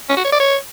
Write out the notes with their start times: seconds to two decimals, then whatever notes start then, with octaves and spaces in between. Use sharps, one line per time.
0.09 C#4
0.17 F#4
0.25 C#5
0.32 D5
0.40 C#5